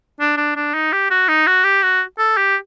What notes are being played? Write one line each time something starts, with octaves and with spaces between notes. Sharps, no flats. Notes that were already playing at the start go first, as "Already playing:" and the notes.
D4
D4
D4
D#4
G4
F#4
D#4
F#4
G4
F#4
A4
G4